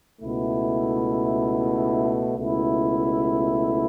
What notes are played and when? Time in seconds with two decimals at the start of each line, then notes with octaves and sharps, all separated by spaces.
0.20 C#2 B2 A3 E4
2.36 C#2 B2 A3 E4